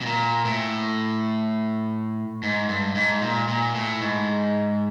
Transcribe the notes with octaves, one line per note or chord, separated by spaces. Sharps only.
B2
A#2
A2
G#2
G2
G#2
A#2
A#2
A2
G#2